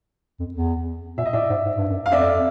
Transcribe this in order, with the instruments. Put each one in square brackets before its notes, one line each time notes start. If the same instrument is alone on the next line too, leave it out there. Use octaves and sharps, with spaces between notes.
[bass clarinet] F2
E2
[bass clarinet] A#2 [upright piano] E5
[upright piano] D#5
[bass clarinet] A2 [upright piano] D5 E5
[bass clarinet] G#2
G#2
G2
F#2
[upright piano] F5
[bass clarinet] F2 [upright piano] D5 E5